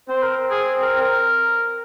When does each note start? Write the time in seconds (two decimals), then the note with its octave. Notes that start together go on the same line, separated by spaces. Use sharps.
0.09 C4 C5
0.23 A#4
0.51 G#4
0.82 A#4
1.01 A#4